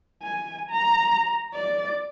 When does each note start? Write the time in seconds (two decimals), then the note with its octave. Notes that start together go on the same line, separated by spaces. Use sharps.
0.23 G#5
0.70 A#5
1.54 D5